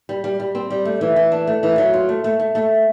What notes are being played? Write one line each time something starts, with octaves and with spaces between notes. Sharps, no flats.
G3
G3
G3
C4
G3
A3
E3
E3
D4
A3
E3
F#3
F4
A3
A3
A3
A3